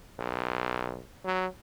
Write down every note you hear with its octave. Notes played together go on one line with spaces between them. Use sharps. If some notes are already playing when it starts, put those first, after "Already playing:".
B1
F#3